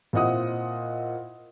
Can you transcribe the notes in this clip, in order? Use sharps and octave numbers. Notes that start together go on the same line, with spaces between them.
A#2 C4 E4 D#5 F#5 D#6